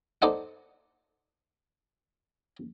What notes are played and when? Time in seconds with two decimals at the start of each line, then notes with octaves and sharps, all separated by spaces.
0.22 D#4 A4 C5 D5 D#5 F#5